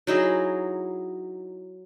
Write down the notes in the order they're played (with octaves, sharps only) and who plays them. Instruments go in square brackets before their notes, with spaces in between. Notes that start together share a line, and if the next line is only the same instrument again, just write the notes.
[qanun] F#3 D#4 E4 G#4